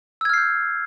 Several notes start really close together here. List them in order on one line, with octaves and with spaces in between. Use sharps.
E6 G#6 F6 C7 G6